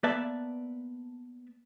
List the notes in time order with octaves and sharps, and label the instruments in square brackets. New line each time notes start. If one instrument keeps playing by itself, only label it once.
[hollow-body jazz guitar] A#3 B3 B4 D5 E5 A5